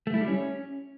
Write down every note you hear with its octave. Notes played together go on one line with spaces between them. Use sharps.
A3
E4
G3
C#4